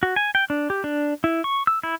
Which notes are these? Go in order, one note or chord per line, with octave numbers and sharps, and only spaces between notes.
F#4
G#5
G5
D4
G4
D4
E4
C#6
E6
E4